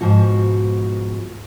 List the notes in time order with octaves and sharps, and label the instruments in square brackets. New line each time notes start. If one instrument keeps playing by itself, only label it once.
[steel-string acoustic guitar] G#2 B2 F3 F#4